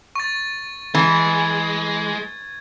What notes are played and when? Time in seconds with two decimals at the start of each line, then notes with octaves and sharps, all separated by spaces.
0.16 C#6 A6
0.95 E3 G#3 G#6